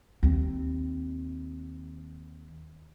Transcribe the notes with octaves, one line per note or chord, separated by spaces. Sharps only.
D#2 C4